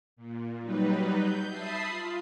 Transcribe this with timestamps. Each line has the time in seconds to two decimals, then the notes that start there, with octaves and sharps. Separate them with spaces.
0.16 A#2
0.62 F#3 G3 D#4 B4
1.18 G6
1.49 E5 A5 B5 D#6 C7
1.88 F4